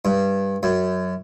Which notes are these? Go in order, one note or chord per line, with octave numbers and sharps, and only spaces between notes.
G2
F#2